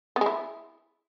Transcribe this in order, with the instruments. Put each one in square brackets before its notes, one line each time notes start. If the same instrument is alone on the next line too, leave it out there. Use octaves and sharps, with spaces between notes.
[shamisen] B3
G#3
E4